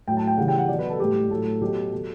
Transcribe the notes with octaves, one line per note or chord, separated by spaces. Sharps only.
A2 F#3 G5
A5
G5
C#3 E3 G3 F#5
G5
F#5
B2 F#3 D5
B4
A4
A2 G3 G4
A2 F#3 A4
B2 F#3 G4
B2 F#3 A4